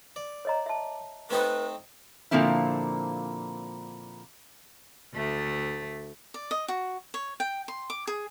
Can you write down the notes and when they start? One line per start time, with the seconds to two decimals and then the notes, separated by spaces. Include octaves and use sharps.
0.16 D5
0.45 C#5 D#5 A#5
0.66 E5 A5
1.31 A3 C4 D#4 B4
2.31 A#2 D3 F3 A#3 C4 E4
5.13 D2 A3
6.34 D5
6.51 D#5
6.68 F#4
7.14 C#5
7.40 G5
7.68 C6
7.90 D6
8.07 G#4